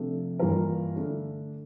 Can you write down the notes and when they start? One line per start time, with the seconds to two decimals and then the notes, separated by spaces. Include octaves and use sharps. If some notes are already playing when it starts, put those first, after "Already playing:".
Already playing: C3 F3 A3 D4 A4
0.39 G2 E3 A#3 F4 A#4
0.96 D3 A3 D4